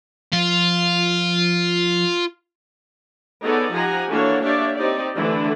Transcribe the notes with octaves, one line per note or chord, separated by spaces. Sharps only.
F3 F4
B3 D#4 G#4 A4 C#5 D5
F3 G4 F#5 G#5 A#5
E3 A#3 D4 F#4 A4 C#5
A#3 D4 G4 C#5 D5 E5
C4 D#4 G4 D5
D3 E3 A3 D4 E4